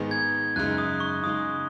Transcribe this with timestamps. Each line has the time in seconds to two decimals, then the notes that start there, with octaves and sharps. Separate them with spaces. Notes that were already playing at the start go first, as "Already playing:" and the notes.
Already playing: G#2 D#3 B3 D#4 G#4
0.11 G#6
0.56 F#2 C#3 G#3 D#4 F#6
0.78 D#6
1.00 C#6
1.23 C#3 G#3 D#4 G#4 D#6